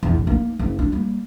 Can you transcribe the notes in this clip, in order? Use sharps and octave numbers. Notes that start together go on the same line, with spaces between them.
E2
A1 F2
A#3 D#4
F#1
D4
G3 A#3